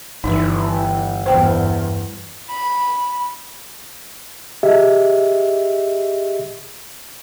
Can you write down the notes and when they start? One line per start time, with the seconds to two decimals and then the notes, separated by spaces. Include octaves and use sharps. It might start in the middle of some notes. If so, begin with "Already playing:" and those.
0.24 G1 E3 D#4
1.26 E2 G2 C5 G5
2.49 B5
4.63 G4 G#4 D#5 E5